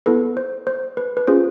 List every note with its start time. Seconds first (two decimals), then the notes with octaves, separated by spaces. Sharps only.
0.06 B3 E4 A4 B4
0.37 C5
0.67 C5
0.97 B4
1.17 B4
1.27 C#4 F4 G#4 C5